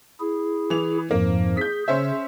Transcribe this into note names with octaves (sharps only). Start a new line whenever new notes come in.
E4 G#4
E3 F7
F2 G#2 F3 A#3
G#4 G6 B6
C#3 C#4 C5 E5